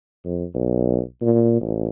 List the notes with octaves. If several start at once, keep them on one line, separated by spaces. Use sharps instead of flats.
F2
B1
A#2
A1